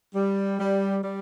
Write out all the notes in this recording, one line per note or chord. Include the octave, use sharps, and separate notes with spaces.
G3
G3
G3